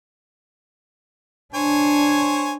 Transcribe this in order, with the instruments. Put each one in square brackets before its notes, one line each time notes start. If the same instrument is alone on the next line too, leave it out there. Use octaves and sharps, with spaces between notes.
[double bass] D4 [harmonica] C5 C#5 G#5